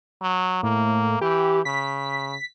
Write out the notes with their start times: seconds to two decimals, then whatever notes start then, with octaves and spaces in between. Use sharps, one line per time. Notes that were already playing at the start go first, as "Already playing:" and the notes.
0.22 F#3
0.63 A2 A#3
1.21 E3 G4
1.65 C#3 B6